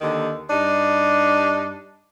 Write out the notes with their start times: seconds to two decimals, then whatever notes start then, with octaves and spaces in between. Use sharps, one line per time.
0.01 D#2 D3 D#3
0.50 G2 D4 D#4